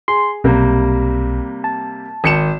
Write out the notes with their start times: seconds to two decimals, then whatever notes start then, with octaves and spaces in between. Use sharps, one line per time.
0.08 G#4 C6
0.44 B1 C3 G3 A#3
1.64 A5
2.24 G#1 C#7 E7